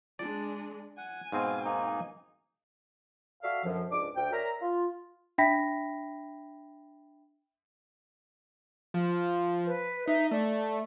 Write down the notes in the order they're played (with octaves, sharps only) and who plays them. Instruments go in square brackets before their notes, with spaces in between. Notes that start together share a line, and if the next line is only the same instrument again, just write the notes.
[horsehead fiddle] G#3 D4 [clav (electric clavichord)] D5
[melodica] F#5 [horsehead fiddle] G#5
[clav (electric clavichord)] G#2 B2 C4 [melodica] F5
[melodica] A#3 D#4
[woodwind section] F#4 A4 D5 E5 F5
F#2 B2 D3 F3
C#2 G#2 D4 D6
D2 G5
A#4 C#5 D5 E5 A#5
F4
[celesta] D4 E5 G5 B5 A#6 B6
[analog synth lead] F3
[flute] B4
[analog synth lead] D#4 [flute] E5
[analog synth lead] A3 [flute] D5